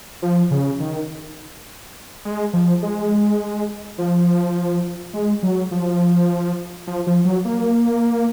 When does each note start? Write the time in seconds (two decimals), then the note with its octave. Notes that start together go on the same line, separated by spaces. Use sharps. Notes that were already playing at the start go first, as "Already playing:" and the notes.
0.22 F3
0.51 C#3
0.80 D#3
2.25 G#3
2.53 F3
2.82 G#3
3.98 F3
5.13 G#3
5.43 F#3
5.71 F3
6.87 F3
7.07 F3
7.25 F#3
7.45 A#3